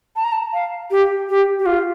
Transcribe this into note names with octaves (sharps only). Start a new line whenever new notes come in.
A5
A#5
A5
F5
G4
G4
G4
F4